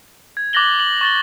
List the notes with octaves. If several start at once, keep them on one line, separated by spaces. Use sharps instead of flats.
G#6
D6 F#6 A6 A#6 F#7 G7
F#7
C#6 A6 G7